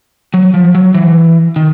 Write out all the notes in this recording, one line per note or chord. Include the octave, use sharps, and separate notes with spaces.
F#3
F3
F#3
E3
D#3